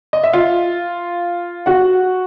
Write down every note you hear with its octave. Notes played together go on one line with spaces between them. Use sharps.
D#5
E5
F4 F5
F#4 F#5